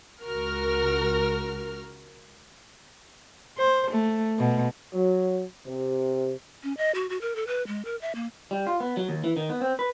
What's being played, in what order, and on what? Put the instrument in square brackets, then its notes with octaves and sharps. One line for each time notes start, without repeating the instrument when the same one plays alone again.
[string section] C#2 F#4 A#4 F6
[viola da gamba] C5
A3
B2
[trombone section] F#3
C3
[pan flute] C#4
D#5
F#4
F#4
A#4
A4
B4
G#3
A#4
E5
A#3
[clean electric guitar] G3
F4
B3
F#3
D#2
E3
D#3
B3
C4
B4